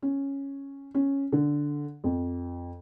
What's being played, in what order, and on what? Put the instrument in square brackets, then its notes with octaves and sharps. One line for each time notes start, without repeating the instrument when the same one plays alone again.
[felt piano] C#4
C#4
D3
F2